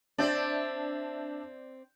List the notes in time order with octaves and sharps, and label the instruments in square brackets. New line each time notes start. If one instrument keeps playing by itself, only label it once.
[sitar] C4 D5 [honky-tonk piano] D4 E5 G6